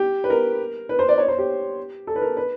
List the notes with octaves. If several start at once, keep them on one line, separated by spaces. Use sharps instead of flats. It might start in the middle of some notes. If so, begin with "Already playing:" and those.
Already playing: G4
B4
A#4
B4
C5
D5
C#5
C5
G4
A4
B4
A#4
B4